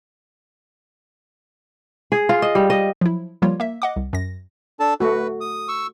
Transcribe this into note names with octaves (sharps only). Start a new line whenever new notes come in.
G#4
F4
D#5
G3
D#5
F3 F#3 E4
F3 G3 A#3 F4 C#5
A#3 E5
D#5 F#5 D6
C2
F#2 A#6
D4 A4 A5
A3 F#4 B4
D#6
C#6 E6